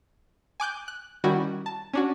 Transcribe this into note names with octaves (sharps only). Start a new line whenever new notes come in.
G#5 D6 F#6 G6
F#6
D#3 G3 C#4 E4 F#4
A5
C#4 D4 F#4